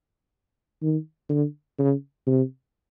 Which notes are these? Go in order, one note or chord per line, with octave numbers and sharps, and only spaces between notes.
D#3
D3
C#3
C3